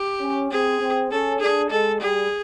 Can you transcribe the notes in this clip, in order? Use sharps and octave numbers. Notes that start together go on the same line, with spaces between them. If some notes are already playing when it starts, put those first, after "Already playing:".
Already playing: G4
C#4
C4 G#4
C4
C#4 A4
D4 G#4
G#3 A4
G3 G#4